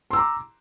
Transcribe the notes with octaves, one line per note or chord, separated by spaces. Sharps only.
A#5 C6 D6 E6